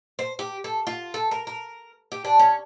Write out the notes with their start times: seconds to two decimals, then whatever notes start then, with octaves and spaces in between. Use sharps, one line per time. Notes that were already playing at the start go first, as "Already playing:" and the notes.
0.19 C5
0.39 G4
0.64 A4
0.87 F4
1.14 A4
1.31 A#4
1.47 A#4
2.12 G4
2.25 D4
2.39 C#4